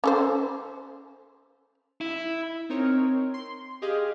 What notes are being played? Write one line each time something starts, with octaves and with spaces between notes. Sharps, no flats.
C#4 A4 C5
E4
C4 D#4 A#4 C#5
C6
G4 G#4 D#5 F5